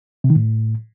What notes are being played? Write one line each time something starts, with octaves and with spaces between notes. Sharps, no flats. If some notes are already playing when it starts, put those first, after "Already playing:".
C3
D#3
A2